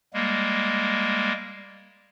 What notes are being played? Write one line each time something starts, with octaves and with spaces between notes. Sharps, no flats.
G3 G#3 A#3